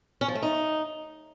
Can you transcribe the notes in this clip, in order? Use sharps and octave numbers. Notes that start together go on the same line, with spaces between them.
C#4
F3
A3
D#4